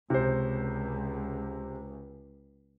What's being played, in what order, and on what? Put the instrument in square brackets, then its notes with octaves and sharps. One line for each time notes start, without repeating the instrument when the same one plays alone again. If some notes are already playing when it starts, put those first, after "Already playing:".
[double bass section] C#2 [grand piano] C3 C5